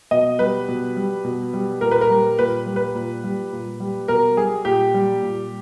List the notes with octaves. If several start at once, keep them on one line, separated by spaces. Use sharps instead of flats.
B2 D#5
G3 B4
B2
G3
B2
G3
A#2 A#4
B4
A#4
G3
A#2 B4
G3
B4
A#2
G3
A#2
G3
B2 A#4
G3 G#4
A#2 G4
G3
A#2